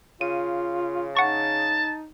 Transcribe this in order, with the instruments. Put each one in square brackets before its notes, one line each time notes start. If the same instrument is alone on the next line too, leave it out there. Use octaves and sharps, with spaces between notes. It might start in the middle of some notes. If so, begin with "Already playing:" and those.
[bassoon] C#3 [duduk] F4 [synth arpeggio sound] D#7
[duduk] D#4 [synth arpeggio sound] F#5 C#6 [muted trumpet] A5